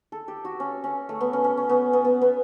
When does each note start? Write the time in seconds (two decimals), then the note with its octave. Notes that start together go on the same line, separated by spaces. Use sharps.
0.12 A4
0.28 G4
0.45 F#4
0.60 C#4
0.84 C#4
1.09 A3
1.21 B3
1.33 C#4
1.44 C#4
1.57 C#4
1.69 B3
1.93 B3
2.04 B3
2.21 B3